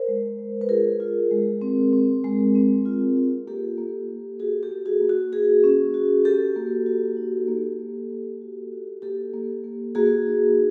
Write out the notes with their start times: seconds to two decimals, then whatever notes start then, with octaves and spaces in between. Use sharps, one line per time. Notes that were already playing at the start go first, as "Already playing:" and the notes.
Already playing: A#4 C5
0.08 G#3
0.39 G#3
0.61 B4
0.69 F4 G#4 A#4
1.00 F4
1.31 G#3
1.61 C4
1.93 C4
2.24 G#3
2.55 C4
2.86 F4
3.16 F4
3.47 A#3 G4 A4
3.78 A#3
4.09 A#3
4.40 F#4 G#4
4.63 G4 A4
4.71 A#3
4.86 F#4 G#4
5.01 A#3
5.09 F#4
5.32 F#4 G#4
5.64 C#4
5.94 F#4
6.25 F#4 G4 A4
6.56 A#3
6.86 F#4
7.17 D#4
7.48 A#3
7.79 A#3
8.10 A#3
8.42 F#4
8.72 F#4
9.02 A#3 G4 A4
9.34 A#3
9.64 A#3
9.95 A#3 F#4 G#4
10.26 D#4